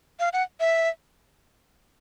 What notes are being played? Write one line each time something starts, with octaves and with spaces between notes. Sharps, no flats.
F5
F#5
E5